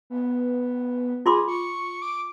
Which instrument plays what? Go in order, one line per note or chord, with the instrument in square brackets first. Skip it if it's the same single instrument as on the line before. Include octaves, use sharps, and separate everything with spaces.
[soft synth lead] B3
[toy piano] F4 C6 D6 [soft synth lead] G#4
[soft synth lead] C#6
D6